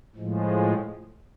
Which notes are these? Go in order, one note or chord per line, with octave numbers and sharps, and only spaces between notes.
A2 F3 G#3